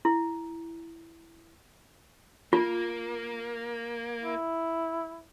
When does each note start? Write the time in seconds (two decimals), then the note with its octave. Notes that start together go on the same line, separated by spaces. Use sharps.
0.05 E4
2.53 A#3 F4
4.22 E4